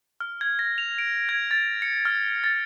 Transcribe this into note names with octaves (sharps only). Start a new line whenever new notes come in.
F6
G#6
A#6
F7
D7
G#6
A6
C#7
F6
A6